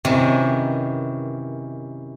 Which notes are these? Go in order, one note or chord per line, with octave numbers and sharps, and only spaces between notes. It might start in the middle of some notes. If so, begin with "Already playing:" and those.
F#2 C3 D#3 E3